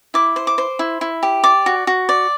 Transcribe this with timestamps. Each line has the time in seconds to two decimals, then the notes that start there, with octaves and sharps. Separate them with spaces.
0.14 E4 D6
0.36 C5
0.47 D6
0.58 C5
0.79 E4
1.01 E4
1.23 G4
1.44 D5 D6
1.66 F#4
1.87 F#4
2.09 D5